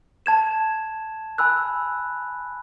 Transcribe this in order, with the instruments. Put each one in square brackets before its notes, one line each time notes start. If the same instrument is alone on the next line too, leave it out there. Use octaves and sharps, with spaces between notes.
[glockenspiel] A5 G#6 E7
G#5 B5 E6 F#6